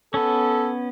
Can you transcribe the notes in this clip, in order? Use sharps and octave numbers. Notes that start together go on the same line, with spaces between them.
B3 C#4 A4